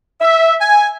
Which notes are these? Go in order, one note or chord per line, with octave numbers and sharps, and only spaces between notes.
E5
G#5